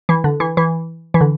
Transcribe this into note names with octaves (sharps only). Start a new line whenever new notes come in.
E3
D3
E3
E3
E3
D3